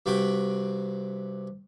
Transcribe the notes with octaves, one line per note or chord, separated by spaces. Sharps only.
G2 C3 F#4 G5 B5